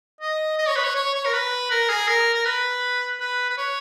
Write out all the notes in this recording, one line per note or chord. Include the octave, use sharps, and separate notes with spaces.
D#5
D#5
C#5
B4
C#5
C#5
C#5
A#4
B4
A#4
G#4
A#4
A#4
B4
B4
B4
C#5